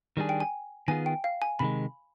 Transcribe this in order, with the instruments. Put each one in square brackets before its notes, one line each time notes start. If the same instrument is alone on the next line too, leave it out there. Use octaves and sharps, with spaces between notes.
[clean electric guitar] D#3 G3 D4 G#4
[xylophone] G5
G#5
[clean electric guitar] D#3 B3 F4 G#4 [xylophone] G#5
[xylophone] G5
F5
G#5
[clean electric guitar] C3 D#3 G#3 [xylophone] B5